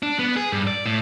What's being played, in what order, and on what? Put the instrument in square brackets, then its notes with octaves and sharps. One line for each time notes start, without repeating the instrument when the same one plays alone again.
[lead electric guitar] D4
B3
G#4
G2
D5
A2